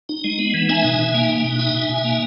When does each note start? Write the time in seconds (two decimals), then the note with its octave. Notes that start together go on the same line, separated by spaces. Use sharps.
0.09 D#4
0.24 G#3
0.39 B3
0.54 E3
0.69 D#4 E5 G#5
0.84 B2
1.00 B2
1.14 A#3
1.29 D#4
1.44 B2
1.59 D#4 E5 G#5
1.75 B2
1.89 B2
2.04 A#3